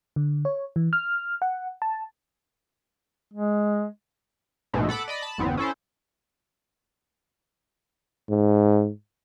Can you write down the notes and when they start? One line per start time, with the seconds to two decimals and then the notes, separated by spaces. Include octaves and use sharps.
0.16 D3
0.45 C#5
0.76 E3
0.93 F6
1.42 F#5
1.82 A5
3.34 G#3
4.74 A#1 G#2 B2 G#3 A3
4.89 A4 F#5 B5 D6
5.08 D5 D#5 B5
5.22 A5 B5
5.38 G1 E2 B3 C4
5.57 C#4 E4 A4 C5
8.29 G#2